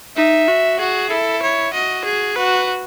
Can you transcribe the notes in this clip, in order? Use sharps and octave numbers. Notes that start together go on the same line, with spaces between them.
D#4 E5
F#4
F#4 G#4
E4 A4
C#5
F#4 D#5
G#4
F#4 B4